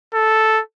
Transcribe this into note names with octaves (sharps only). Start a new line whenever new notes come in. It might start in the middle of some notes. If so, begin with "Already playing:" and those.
A4